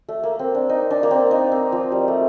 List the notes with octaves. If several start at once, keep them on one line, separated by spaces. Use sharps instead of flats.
A3
A#3
C4
D4
D#4
D4
A#3
C4
D#4
C4
F3
G3
A3